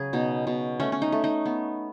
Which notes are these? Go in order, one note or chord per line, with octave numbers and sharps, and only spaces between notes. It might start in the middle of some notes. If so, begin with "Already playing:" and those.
Already playing: C#3 F#3 G#4
B2 D#4
B2
A3 C#4
C#4
D#4
A3
D#4
B3